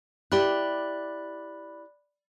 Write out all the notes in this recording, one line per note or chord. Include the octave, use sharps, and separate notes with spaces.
E4 G4 D5 B5 F#6